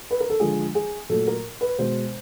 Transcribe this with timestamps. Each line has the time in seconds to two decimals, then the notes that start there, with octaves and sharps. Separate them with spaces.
0.11 B4
0.20 A#4
0.30 A4
0.40 D3 F3 G#3 G#4
0.75 G#4
1.09 A#2 F#3 A3 A4
1.27 A#4
1.61 B4
1.79 B2 G#3 C5